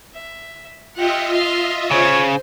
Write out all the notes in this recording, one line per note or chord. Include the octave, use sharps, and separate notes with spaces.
E5
F4 G4 D#5 E5 F#5
F5 C6
C#3 C5 C#5